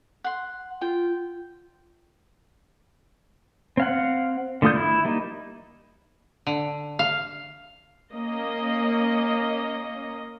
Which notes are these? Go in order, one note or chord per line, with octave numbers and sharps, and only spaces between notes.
F#5 C6
F4 G5
C4 F5 F#5
D3 A3 F4 D#6 G6
E4
G3 A#3 D#4
D3
F5
A#3 C#4 D#5